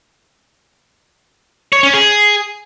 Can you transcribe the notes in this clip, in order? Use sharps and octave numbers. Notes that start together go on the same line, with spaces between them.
C#5
C#4
G#4